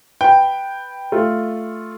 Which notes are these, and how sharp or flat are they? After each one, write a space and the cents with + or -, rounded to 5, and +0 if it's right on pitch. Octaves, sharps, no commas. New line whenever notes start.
B4 +0 G5 +0
A3 +0 F4 +0